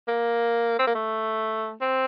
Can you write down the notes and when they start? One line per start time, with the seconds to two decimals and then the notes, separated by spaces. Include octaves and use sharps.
0.08 A#3
0.79 C4
0.87 A#3
0.95 A3
1.81 C4